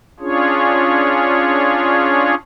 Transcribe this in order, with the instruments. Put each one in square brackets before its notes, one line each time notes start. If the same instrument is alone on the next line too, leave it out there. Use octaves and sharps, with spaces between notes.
[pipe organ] C#4 D4 F4 G#4 C#5